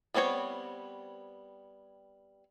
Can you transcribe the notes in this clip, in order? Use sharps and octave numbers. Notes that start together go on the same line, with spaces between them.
G3 B3 C4 G#4 C#5